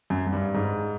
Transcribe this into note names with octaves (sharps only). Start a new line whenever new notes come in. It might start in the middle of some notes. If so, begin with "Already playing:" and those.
F#2
F#2
G2
G#2